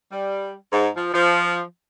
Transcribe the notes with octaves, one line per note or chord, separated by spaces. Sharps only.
G3
G#2
F3
F3